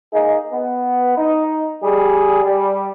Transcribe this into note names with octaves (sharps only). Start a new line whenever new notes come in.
A#3 D#4 G#4
B3
D#4
G3 G#4
G3